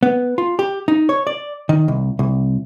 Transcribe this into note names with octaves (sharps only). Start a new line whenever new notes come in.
B3
F4
G4
D#4
C#5
D5
D#3
C2
C2